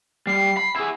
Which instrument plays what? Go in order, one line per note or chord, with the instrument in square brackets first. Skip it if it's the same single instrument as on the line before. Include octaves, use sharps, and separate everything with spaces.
[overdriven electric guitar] G3 [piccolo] C7
[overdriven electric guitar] B5
E4 G#4